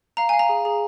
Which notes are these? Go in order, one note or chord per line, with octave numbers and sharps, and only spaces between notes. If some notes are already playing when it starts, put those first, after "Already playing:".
F5 A#5
F5 G#5
A#5
G#4
G#4